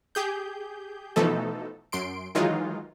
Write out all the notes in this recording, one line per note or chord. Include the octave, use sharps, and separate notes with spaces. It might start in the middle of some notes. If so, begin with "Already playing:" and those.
G4 G#4 G6
B2 E3 F3 A3 D#4 A4
F#2 C6 D7
D#3 E3 F#3 G#3 D#4 F4